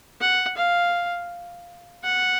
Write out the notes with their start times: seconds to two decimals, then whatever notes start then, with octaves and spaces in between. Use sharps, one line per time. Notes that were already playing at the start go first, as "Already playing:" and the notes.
0.21 F#5
0.57 F5
2.04 F#5